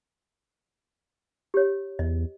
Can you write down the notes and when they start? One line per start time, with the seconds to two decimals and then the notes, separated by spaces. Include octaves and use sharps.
1.54 G4 C#5
1.99 E2 D#5